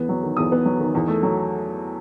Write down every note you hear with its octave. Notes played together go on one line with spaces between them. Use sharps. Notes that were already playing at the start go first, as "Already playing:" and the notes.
Already playing: E2 B3
F#3
D#3
E2 D#6
B3
F#3
D#3
E2
A3
F#3